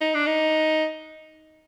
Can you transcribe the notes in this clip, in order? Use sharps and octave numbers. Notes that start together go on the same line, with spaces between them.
D#4
D4
D#4